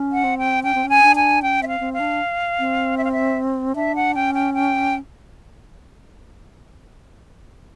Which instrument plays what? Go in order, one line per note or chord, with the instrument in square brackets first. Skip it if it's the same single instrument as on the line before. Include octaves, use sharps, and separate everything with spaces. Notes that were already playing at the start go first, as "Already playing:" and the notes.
Already playing: [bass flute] C#4
[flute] F#5
[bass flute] C4
[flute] G5
[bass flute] C#4 [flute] G5
[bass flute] C4
C#4
[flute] G#5
[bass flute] D4
[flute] G#5
[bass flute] C#4 [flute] G5
[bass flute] C4 [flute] E5
[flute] F5
[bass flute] C4
[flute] F5
[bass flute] D4
C4
[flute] E5
F5
E5
[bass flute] D4 [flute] E5
[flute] F#5
[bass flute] C#4 [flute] G5
[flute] G5
G5